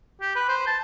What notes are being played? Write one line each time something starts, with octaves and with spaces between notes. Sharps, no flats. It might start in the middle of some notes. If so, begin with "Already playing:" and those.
G4
B4
C5
A5